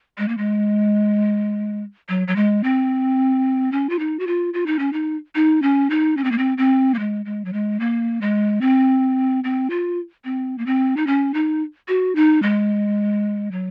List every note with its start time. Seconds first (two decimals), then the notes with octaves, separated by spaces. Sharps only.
0.18 G#3
0.28 A#3
0.38 G#3
2.09 F#3
2.28 F#3
2.36 G#3
2.64 C4
3.72 C#4
3.90 F4
3.99 D#4
4.19 F#4
4.27 F4
4.54 F4
4.66 D#4
4.79 C#4
4.93 D#4
5.35 D#4
5.62 C#4
5.90 D#4
6.17 C#4
6.24 C4
6.32 A#3
6.38 C4
6.58 C4
6.94 A#3
6.99 G#3
7.25 G#3
7.45 F#3
7.53 G#3
7.80 A#3
8.21 G#3
8.61 C4
9.44 C4
9.70 F4
10.25 C4
10.58 A#3
10.66 C4
10.97 D#4
11.07 C#4
11.34 D#4
11.88 F#4
12.15 D#4
12.42 G#3
13.52 F#3